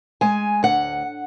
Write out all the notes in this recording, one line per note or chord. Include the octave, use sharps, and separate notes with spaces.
G#3 G#5
D2 F#5